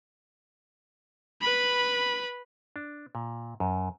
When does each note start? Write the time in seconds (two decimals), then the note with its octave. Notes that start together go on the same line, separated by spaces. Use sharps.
1.41 B4 B5
2.76 D4
3.15 A#2
3.60 F#2